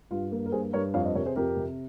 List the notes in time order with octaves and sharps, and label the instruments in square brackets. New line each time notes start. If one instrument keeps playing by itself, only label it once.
[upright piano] G2 F4
A#3
A#4
G2 G#4 C5
G2 A#4 C#5
F2 C#5 F5
C5 D#5
C3 A#4 C#5
G#4 C5
F2 G4 A#4
C3